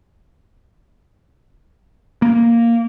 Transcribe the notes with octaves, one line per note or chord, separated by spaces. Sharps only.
A#3